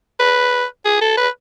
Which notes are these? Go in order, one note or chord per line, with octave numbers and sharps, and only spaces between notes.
B4
G#4
A4
B4